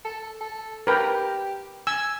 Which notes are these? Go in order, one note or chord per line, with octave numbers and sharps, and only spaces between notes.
A4
A4
G4 A#4 B4 G5
G#5 E6